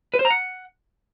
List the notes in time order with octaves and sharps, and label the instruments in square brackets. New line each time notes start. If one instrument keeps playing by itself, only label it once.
[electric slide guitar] B4
C5
A#5
F#5